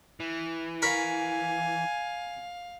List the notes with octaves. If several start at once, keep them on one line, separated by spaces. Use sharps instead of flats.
E3 F6
A#4 F5 G#5 B5 C#6